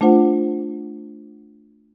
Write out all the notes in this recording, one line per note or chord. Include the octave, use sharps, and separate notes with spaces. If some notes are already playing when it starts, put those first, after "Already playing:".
A3 D4 F4 C5 F#5